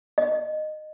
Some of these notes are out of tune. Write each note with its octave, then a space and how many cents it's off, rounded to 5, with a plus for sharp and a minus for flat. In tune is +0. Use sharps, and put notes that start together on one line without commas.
D#5 -20